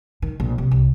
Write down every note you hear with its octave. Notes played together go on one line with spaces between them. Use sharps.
D#3
A#1
C3
C2